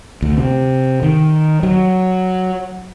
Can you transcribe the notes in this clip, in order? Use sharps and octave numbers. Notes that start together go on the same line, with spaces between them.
D2
C3
D#3
F#3